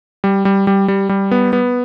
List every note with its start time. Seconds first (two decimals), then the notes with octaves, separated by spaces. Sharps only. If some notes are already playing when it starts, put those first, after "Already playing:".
0.24 G3
0.45 G3
0.67 G3
0.88 G3
1.09 G3
1.31 B3
1.53 B3